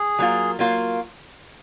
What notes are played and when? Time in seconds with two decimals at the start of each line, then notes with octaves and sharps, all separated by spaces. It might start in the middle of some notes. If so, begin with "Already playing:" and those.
Already playing: G#4
0.19 F#3 A#3 F4
0.59 F#3 A#3 F4